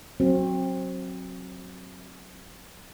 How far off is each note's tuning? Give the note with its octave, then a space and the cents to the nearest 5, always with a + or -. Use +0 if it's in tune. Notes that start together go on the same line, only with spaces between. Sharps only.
F#3 +0 C4 +25 F#4 +0